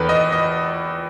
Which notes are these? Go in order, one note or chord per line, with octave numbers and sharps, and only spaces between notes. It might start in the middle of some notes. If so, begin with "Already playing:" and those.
Already playing: E2 D#3 A4 B4
D#5
D#5